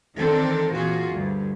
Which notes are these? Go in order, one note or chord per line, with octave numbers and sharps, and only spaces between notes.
D#3 E3 C4 D4 A4 A#4
A#2 E3 F4 F#4 G#4
D2 G2